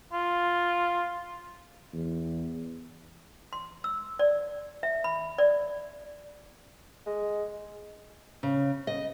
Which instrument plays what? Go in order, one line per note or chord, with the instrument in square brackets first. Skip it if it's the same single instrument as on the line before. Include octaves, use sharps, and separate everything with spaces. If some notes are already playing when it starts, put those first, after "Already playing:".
[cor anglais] F4
[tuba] E2
[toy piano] C6
E6
D5
E5
B5
D5
[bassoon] G#3
[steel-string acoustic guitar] C#3
D#5